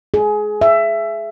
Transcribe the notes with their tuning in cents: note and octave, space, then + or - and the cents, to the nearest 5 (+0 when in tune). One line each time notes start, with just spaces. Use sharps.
G#4 +20
E5 +20